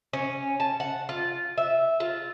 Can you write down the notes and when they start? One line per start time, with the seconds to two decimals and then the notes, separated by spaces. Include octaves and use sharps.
0.13 C#4
0.60 A5
0.80 F#5
1.09 F4
1.58 E5
2.00 F4